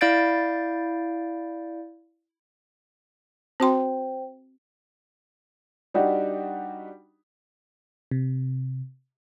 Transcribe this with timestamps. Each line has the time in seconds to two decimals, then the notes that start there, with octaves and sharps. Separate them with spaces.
0.01 E4 D5 F5 G6 A6 D7
3.60 C4 F#4 C5 G5 C6
5.94 G3 D4 D#4 F#4 G4
8.11 C3